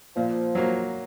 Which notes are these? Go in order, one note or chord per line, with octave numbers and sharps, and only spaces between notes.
A#2 F3
F#3 A#3